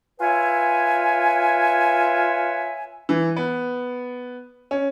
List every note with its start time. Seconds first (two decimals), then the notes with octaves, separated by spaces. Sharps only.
0.20 F4 B4 C#5 E5 G#5
3.09 E3
3.36 B3
4.71 C#4